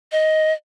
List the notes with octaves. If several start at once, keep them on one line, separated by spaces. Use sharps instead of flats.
D#5